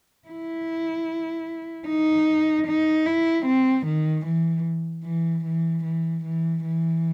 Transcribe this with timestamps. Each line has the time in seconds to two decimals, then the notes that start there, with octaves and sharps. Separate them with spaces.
0.28 E4
1.88 D#4
2.67 D#4
3.06 E4
3.46 C4
3.87 D#3
4.26 E3
5.05 E3
5.45 E3
5.84 E3
6.24 E3
6.64 E3